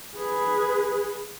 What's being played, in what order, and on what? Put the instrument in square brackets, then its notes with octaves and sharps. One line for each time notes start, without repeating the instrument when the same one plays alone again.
[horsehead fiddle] G#4 B4